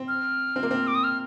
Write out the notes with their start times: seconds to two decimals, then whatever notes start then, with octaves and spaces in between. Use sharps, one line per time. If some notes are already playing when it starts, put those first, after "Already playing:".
Already playing: C4
0.08 F6
0.56 C4
0.63 A#3
0.71 C4
0.87 D6
0.95 D#6
1.04 F6